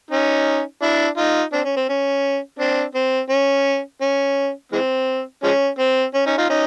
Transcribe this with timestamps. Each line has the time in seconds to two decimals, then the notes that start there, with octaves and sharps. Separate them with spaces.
0.11 C#4 D#4
0.82 D4 E4
1.17 D#4 F4
1.52 C4 D4
1.65 C#4
1.76 C4
1.89 C#4
2.59 C4 D4
2.95 C4
3.30 C#4
4.01 C#4
4.72 E3 G#3 C4
5.43 F3 G#3 C#4
5.79 C4
6.14 C#4
6.26 C#4 D#4
6.38 D#4 F4
6.49 C#4 D#4